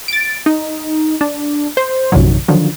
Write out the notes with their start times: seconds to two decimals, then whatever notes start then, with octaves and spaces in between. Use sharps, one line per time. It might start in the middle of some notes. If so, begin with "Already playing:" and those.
0.08 A6 D7
0.46 D#4
1.21 D4
1.77 C5
2.12 A#1 F#2 C3 D#3 F#3
2.48 D3 D#3 F3 F#3